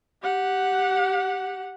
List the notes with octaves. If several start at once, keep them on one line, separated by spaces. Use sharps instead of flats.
G4 F#5